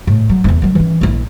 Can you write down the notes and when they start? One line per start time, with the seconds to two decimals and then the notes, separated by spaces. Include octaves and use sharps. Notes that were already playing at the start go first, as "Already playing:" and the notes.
0.07 A2
0.29 F#3
0.44 D#1 E2
0.62 D#3 F#3
0.75 E3 C#4
1.01 A#1 E4